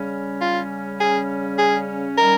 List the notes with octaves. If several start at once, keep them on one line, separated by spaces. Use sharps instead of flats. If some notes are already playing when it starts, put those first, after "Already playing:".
Already playing: C#3 G3 C#4
F4
G#4
G#4
D#3 G3 C#4 A#4